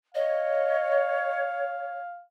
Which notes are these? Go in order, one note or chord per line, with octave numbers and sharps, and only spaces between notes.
C#5 D#5 F5